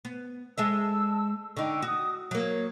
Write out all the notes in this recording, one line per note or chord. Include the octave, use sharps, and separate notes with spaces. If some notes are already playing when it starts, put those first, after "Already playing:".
B3
G#3 A4 E5 A5 E6
D3 D#4 G5 C#6
F#4 D#6
F#3 A#3 C#5